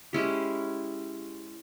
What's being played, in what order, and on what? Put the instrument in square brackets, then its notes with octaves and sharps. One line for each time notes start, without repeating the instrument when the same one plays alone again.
[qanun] G#3 C#4 E4 G4